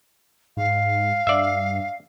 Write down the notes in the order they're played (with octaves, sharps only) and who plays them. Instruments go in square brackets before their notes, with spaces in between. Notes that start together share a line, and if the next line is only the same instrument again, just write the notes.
[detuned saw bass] G#2 [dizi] F5
[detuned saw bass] G2 [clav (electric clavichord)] D5 E5